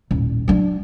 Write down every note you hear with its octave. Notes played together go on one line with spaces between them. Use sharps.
D#1 A1
F#3 D4